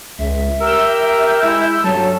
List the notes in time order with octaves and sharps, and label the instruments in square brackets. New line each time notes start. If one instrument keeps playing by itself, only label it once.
[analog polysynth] C#2 [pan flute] E5
[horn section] G4 A#4 [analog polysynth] E6 G6
[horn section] G#3 E4
[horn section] G2 A4 [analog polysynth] F#3 C#4 [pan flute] A5